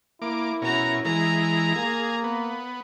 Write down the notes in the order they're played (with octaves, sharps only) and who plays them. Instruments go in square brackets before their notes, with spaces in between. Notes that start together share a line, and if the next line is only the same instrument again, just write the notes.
[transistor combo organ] A#3 D6 [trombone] E4
[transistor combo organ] B2 C#4 A#4 [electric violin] F#4 A#5
[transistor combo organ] E3 G#3 [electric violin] A#5
[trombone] A#3 [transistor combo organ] G#4
[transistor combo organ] B3